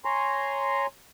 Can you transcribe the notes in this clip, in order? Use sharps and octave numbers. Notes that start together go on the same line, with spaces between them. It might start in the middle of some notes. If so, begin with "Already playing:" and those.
C#5 G#5 A#5 C6